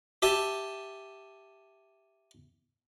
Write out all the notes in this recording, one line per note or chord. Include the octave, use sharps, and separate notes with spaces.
G4 E5 G#5 A5